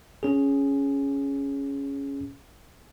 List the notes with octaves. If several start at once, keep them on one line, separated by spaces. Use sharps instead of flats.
C#4 G#4